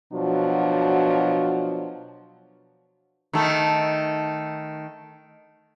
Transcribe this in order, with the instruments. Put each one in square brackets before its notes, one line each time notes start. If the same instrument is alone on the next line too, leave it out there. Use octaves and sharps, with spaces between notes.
[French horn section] B2 F3 F#3 D4
[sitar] D#3 A3